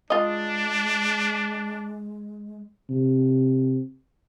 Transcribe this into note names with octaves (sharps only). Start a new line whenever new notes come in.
G#3 D4 F4 D#5
C3